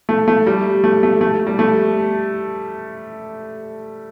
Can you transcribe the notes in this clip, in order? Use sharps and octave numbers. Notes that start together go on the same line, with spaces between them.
A3
A3
G3
A3
A3
A3
G3
A3